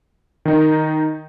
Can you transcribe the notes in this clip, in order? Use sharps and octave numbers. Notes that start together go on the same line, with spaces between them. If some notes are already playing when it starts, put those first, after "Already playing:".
D#3 D#4